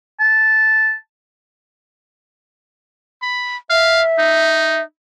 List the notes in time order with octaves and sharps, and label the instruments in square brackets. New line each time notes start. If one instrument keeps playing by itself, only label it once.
[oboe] A5
[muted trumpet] B5
[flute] E5 [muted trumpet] F5
[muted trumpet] D#4